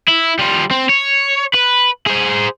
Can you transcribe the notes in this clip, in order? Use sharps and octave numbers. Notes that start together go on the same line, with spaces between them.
E4
G3 F4
C4
C#5
B4
G#4 C5